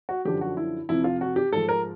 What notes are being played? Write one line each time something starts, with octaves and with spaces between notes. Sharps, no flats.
F#4
F#2 D3 F3 G4
F#4
E4
F2 C3 F3 E4
F4
F#4
G4
G#2 F3 A4
A#4